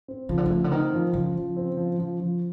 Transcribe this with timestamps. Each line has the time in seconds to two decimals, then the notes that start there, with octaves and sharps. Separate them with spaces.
0.08 C4
0.29 C#3 F3
0.38 D3
0.46 C#3 A3
0.64 D3
0.72 D#3 C4
0.93 F3
1.13 C#3 F3
1.36 F3
1.56 C4
1.77 F3
1.99 F3
2.20 F3